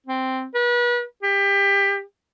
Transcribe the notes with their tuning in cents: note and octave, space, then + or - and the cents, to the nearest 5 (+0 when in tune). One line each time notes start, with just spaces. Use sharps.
C4 -5
B4 -35
G4 +25